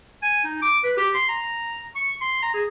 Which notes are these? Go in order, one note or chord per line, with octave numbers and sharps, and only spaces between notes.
G#5
D#4
D6
B4
G4
C6
A#5
C#6
C6
A#5
G#4